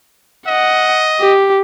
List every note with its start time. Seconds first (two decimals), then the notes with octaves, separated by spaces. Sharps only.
0.47 D#5 F#5
1.21 G4